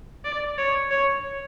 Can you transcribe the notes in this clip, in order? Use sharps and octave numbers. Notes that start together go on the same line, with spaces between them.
D5
C#5
C#5